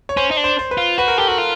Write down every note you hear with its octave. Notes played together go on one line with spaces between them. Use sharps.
C#5
C#4 C5
D#4
D4
C5
C5
B4
F4
F#4 B4
A#4
G4 A4
F#4 A#4
F4